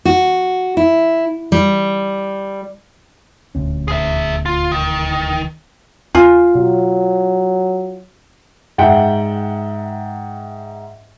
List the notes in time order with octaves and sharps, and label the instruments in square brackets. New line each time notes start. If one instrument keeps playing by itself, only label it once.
[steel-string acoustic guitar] F#4
E4
G3
[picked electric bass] D#1 D2 C#4
[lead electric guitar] G#4 E5
F4
D#3
[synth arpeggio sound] D#2 G#5 [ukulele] F4
[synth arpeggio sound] B2 [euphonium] F#3
[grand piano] G#2 E5 F#5 G5